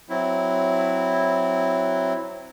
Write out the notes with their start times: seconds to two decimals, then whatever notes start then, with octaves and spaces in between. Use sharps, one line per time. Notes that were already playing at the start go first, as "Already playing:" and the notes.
0.09 F#3 C4 E4